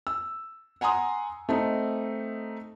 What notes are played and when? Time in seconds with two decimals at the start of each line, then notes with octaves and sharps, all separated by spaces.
0.07 E6
0.81 F#5 G#5 A#5 C6 D#6
1.49 A3 C4 D#4